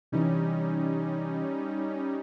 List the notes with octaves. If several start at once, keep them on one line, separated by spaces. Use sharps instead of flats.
C3 E3 G3 C#4 D#4